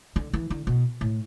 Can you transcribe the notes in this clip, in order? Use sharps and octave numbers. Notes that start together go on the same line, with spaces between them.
D3
E3
D3
B2
A2